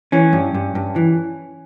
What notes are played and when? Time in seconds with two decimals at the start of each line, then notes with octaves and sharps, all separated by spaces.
0.12 E3 C#4
0.33 G2
0.54 G2
0.75 G2
0.96 E3